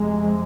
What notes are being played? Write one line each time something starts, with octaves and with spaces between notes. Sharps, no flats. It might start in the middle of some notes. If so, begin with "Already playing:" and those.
Already playing: F2 C3 G#3